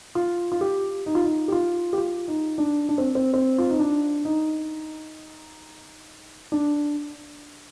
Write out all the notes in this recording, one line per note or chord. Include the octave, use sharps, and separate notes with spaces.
F4
F4
G4
D#4
F4
D#4
G4
F4
G4
F4
D#4
D4
D4
C4
C4
C4
F4
D#4
D4
D#4
D4